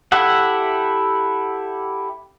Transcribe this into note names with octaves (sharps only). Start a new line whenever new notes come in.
E4 G4 A4 E5 F#5